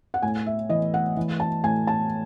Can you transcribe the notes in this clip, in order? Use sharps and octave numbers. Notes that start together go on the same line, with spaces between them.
F#5
A2 G#5
E5
E3 D#5
F#5
E3
A5
A2 G#5
A5